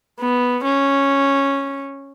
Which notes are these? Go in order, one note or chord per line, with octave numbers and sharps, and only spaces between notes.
B3
C#4